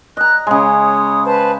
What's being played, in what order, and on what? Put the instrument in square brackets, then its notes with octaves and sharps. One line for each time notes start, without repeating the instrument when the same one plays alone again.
[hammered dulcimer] D#5 A#5 [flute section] F#6
[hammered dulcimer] C#3 G#3 [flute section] C#5 D#6
[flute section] B4 C5 A5